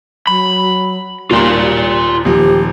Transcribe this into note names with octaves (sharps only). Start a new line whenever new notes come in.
F#3 B5
D#1 D#2 G3 F4 D5 C6
D#1 F3 G4